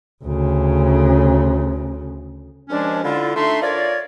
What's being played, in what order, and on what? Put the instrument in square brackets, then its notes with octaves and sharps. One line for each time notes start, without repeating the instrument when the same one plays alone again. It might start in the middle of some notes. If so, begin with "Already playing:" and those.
[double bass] D2 C#3
[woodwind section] D#2 F3 G#3 C#4 D4
D3 E4 F4
A3 D4 D#4 E5 C6
F4 A#4 C#5 D5